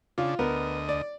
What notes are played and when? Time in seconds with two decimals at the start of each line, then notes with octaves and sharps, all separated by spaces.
0.18 C#3 D4 F4
0.39 D2 B3 A#4 D#5
0.89 D5